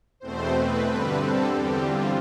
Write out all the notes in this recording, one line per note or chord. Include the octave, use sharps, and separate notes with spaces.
E2 B2 A3 C4 C5
B4
G2 D3 G3 C4
A4
E2 D3 G3 C4 G4
F4